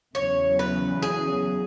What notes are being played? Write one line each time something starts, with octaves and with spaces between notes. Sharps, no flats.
E2 C#3 F#3 C#5
B4
G#4